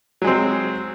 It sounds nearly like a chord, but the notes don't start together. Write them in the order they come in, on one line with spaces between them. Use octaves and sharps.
F#3 G#3 C4